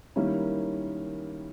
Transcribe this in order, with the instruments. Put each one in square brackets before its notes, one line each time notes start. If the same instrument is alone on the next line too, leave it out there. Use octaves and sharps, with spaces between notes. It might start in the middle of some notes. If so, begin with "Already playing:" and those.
[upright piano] D#3 G3 A#3 C#4 E4